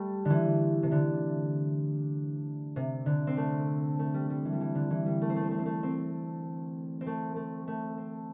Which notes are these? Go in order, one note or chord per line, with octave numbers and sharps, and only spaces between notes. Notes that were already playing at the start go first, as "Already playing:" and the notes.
Already playing: G3 A3
D3 E3
C3
D3
C3
D3
C4
A3
A3
G3
G3
E3
G3
E3
D3
E3
G3
A3
C4
A3
C4
A3
C4
A3
C4
C4
A3
A3
A3
C4